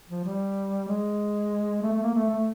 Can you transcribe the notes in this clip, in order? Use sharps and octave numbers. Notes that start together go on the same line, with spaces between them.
F3
G3
G#3
A3
A3
A#3
A3
A3